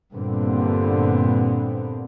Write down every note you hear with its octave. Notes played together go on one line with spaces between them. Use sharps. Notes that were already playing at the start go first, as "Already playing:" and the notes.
G2 A#2 D3 B3 C4